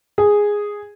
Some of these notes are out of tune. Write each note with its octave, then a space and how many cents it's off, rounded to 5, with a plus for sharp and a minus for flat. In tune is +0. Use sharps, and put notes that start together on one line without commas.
G#4 -5